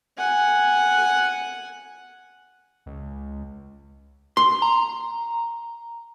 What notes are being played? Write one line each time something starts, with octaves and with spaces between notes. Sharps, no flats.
F#5 G#5
C#2
C6
A#5